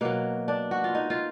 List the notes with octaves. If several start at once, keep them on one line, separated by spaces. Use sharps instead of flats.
B2 F#3 A#3
D4
F#4
F4
D#4
F4